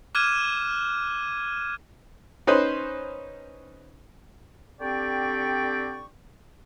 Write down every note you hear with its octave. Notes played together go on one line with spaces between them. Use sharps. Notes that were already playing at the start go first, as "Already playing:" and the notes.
D6 F6 F#6 G#6 D#7 E7
C#4 D#4 B4 C5
D3 C4 G4 D5 G5 C#6